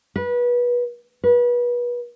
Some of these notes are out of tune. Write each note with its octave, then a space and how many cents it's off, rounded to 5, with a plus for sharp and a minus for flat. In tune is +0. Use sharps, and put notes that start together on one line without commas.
B4 -25
B4 -30